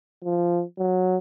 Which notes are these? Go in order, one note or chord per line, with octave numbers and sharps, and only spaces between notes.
F3
F#3